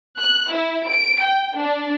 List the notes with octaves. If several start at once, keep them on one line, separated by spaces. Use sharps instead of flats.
F#6
E4
D7
G5
D4